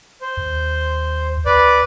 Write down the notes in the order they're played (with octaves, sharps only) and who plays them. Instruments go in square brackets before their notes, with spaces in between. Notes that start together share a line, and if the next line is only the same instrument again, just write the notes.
[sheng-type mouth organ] C5
[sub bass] D#2
[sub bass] D2 [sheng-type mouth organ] B4 D5